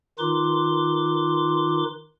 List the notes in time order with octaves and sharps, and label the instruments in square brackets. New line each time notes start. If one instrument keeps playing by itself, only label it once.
[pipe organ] D#3 D#4 F4 B4 C6 D6